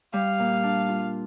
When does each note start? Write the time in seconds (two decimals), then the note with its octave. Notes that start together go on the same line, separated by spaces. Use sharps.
0.13 G3 F5
0.39 A#2
0.63 D4
0.89 F4